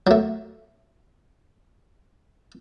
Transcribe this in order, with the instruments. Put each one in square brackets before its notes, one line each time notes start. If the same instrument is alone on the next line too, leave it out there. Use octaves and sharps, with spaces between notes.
[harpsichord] F#3 A3